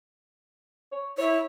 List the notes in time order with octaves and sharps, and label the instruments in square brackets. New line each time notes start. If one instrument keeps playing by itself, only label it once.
[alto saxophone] C#5
[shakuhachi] E4 [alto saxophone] C#5